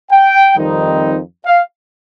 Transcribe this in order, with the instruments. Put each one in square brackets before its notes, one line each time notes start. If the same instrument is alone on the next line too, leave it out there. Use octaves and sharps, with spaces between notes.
[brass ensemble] G5
F2 D#3 G3 C4 D#4
F5